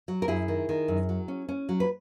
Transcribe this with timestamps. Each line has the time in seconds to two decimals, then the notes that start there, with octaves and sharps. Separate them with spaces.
0.08 F#3
0.22 A#4
0.28 F#2 E4 G#4
0.48 D#3
0.69 D#3
0.88 F#2
1.09 F#3
1.28 C#4
1.49 C#4
1.69 F#3
1.80 B4